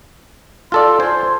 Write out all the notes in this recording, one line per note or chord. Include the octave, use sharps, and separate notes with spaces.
F4 A4 D5 C6
C5 G#5